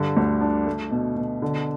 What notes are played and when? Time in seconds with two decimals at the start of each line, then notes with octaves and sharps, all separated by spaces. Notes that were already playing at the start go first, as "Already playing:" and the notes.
Already playing: G2 D3
0.17 D2
0.41 D4
0.67 A3
0.91 B2
1.16 B2
1.42 D3